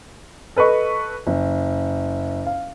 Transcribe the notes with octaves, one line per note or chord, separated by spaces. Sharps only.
A4 B4 D#5 C#6
F#1
F5